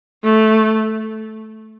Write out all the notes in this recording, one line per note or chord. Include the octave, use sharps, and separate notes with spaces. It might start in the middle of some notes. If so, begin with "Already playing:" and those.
A3